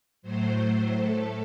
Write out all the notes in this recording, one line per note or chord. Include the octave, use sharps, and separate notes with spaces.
A2 F#3 A3 C5
A2 A3 A4